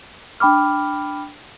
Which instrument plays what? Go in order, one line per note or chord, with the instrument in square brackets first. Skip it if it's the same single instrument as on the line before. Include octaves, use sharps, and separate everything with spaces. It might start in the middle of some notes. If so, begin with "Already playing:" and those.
[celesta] D4 G5 B5 D6 F6